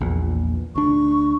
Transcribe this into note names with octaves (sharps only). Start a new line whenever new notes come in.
A#1 E2 A#2
D2 D4 C#6